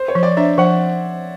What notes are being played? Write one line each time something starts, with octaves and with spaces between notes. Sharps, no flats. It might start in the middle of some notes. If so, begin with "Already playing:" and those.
Already playing: C5
C#5
F3
D5
D4 E5
F3 F#5